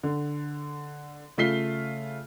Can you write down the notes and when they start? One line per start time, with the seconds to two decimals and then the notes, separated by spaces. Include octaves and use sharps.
0.04 D3
1.38 C#3 A3 F4 B6 C7 G7